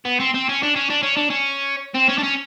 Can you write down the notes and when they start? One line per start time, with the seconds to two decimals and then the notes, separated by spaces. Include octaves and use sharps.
0.05 B3
0.20 C4
0.34 C4
0.49 C#4
0.63 D4
0.76 C#4
0.90 D4
1.03 C#4
1.17 D4
1.30 C#4
1.95 C4
2.09 C#4
2.18 D4
2.24 C#4